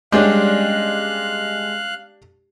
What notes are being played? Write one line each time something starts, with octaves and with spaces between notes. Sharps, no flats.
G3 G#3 B3 C#4 D4 G4 F5 F#6